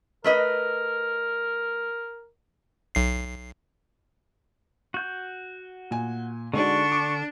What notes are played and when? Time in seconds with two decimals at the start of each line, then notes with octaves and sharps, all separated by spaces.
0.24 A3 A#4 B4 D#5
2.95 B1 C7
4.94 F#4 G6
5.91 A#2 G#5
6.54 D3 G#3 D4 D#4 F#4 D5 C#6
6.92 D6